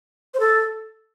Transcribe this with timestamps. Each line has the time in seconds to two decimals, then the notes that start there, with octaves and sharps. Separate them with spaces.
0.34 C5
0.40 A4